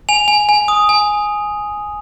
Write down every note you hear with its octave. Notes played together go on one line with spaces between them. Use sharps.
G#5 F7
G#5
G#5
D#6
G#5